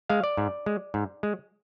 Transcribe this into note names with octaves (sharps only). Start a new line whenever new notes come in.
G#3 F5
D5
G#2
G#3
G#2
G#3